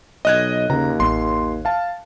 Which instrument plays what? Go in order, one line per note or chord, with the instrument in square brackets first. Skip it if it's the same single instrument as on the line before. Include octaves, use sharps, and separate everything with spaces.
[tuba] B1 [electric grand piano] D#5 F#6 G#6
[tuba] D#2 [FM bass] C#3 [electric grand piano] A#5
[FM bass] A1 [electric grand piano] C6
[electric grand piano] F5 A5